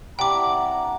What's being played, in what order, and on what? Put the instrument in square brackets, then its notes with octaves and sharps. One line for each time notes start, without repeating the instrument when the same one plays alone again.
[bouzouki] C3 D4 E4 [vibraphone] F#5 [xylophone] G5 D6 [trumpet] A#5